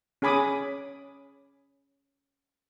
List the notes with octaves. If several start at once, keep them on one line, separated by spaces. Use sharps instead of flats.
C#4 G#4 G#5 B5 D6 D#6